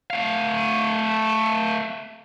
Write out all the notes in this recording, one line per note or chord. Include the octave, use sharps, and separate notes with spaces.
A3 F5